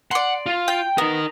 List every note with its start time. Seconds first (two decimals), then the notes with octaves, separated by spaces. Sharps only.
0.11 D5 F#5 C6
0.46 F4
0.68 G5
0.98 B3 D#4 A#4